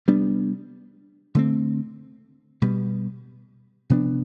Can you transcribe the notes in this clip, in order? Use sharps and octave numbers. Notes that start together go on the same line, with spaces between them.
C3 G3 B3 D4
D3 A3 C4
B2 G3 B3
C3 F3 B3 D4